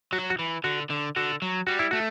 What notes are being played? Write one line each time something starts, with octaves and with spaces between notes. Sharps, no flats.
F#3 F#4
F#4
E3
D3 F#4
D3
D3 F#4
F#3
G3 F#4
E4
A3 F#4